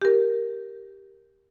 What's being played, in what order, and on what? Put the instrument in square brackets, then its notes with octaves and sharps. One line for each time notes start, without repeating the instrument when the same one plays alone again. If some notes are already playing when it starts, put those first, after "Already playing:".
[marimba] G4 A#4